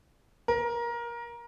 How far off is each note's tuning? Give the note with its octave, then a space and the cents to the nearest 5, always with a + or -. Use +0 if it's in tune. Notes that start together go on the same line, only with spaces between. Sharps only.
A#4 +20